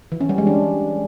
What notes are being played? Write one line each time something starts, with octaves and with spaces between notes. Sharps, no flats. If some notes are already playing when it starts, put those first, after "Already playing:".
E3
C#4
G3
G#3
D4